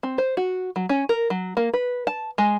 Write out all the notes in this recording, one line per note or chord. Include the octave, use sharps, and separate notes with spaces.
C4
C5
F#4
F#3
C#4
A#4
F#3
A#3
B4
A5
G#3